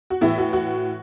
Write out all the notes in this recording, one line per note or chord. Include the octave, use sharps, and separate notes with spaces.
F#4
A2 E3 E4
F#4
F#4